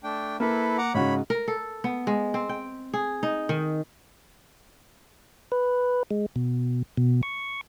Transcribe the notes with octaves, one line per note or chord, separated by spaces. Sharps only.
A3 D4 G5
A#3 E4 A4 B4
F#5 A#5 D6
G#2 C#3 F#4 C#5 B5
A#4
A4
B3
G#3
C4
G5
G#4
D#4
D#3
B4
G#3
B2
B2
C#6